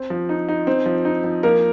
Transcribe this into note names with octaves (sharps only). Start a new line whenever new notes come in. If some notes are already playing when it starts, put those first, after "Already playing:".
Already playing: C4
F3
D#4
D#4
C4
F3
D#4
F3
F3 A#3 A#4